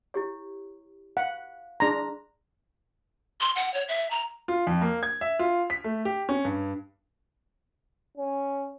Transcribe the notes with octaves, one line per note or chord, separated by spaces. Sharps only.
E4 G4 C#5
F5 F#5
D4 E4 G#4 A#5 C6
C6
F#5
C#5
E5
A#5
F4
F2
A#3
G#6
E5
F4
B6
A3
G4
C#4
G2
C#4